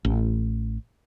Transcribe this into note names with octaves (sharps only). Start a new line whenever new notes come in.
A1